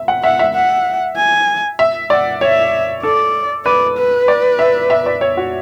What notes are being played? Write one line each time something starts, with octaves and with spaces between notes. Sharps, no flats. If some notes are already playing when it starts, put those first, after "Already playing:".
Already playing: E5
F#5
E5 F#5
E5
F#5
G#5
E5
D5 F#5
C#5 E5
A4 D5
B4 D5
B4
D5
E5
E5
D5
C#5
F#4